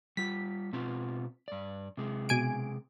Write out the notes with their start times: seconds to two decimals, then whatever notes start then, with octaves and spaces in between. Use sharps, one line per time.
0.17 G3 F4 B6
0.73 B2 C4 F4
1.48 G2 D5
1.97 C3 G#3
2.29 B2 G#5 D7